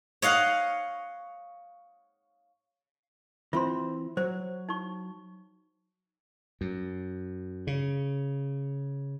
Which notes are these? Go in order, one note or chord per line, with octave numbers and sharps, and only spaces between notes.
C#5 D#5 F5 F#5
E3 C4 F4 C6
F#3 C5 C#5
D#4 C#6
F#2
C#3